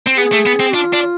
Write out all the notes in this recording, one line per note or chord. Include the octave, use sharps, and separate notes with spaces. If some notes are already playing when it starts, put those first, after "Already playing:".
C4
B3 G#4
A3
B3
C4
D4 F4
D4